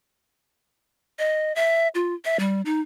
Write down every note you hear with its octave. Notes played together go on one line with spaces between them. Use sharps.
D#5
E5
F4
E5
G3
D#4